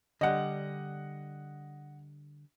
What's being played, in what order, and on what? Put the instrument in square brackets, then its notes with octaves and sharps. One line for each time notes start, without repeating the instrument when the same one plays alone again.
[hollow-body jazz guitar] D3 G3 [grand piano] D#5 F#5